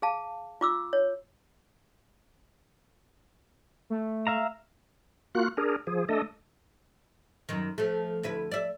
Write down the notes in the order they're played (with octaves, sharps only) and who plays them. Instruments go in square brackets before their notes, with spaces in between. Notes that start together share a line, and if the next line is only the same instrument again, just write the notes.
[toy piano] G#4 F5 A5
F4 D6 E6
C#5
[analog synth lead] A3
[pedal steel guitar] E5 F5 A#5
[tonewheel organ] A#3 F4 F#4 F#6
D4 G#4 A#4
F3 G#4
A3 D4 A4 D#5
[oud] F#2 D#3
F3 A3
D2 E4 B4
D5 E5